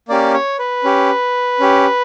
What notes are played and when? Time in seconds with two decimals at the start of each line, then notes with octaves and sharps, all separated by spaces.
0.08 A#3 C#4 G4 D5
0.34 C#5
0.59 B4
0.84 C#4 G4
1.60 C#4 G4